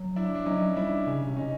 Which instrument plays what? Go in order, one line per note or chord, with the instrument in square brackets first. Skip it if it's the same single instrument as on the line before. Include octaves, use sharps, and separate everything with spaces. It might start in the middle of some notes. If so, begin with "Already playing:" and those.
Already playing: [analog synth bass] F#3
[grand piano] D4 E4
D4
[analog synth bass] F#3 [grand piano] C#4 D#4
[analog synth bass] G3 [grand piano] D4 E4
[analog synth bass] C#3 [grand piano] C#4
[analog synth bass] C3
[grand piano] C#4 D#4